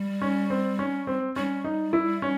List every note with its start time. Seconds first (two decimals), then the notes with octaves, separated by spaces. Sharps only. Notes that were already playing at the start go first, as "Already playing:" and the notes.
Already playing: G3
0.22 C#4
0.50 C4
0.79 C#4
1.07 C4
1.36 G3 C#4
1.64 D#4
1.93 E4
2.22 C#4